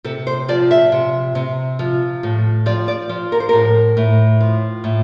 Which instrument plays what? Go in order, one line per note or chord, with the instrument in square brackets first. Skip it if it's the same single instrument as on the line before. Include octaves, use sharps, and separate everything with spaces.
[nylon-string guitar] C3 A4
C5
F3 D5
E5
C3
C3
F3
A2
F3 D5
D5
F3
A#4
C5
A2 A#4
A2
F3
A2